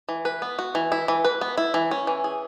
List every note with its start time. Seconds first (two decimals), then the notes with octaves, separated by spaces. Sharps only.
0.09 E3
0.25 B4
0.42 B3
0.59 F#4
0.75 E3
0.92 E4
1.08 E3
1.25 B4
1.41 B3
1.58 E4
1.74 E3
1.91 C#4
2.07 E3
2.24 G#4